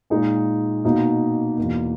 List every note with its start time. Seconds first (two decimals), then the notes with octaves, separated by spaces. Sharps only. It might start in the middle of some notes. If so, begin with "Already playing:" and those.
0.10 A#2 G#3 D#4
0.84 B2 A#3 D#4
1.58 E2 B2 A#3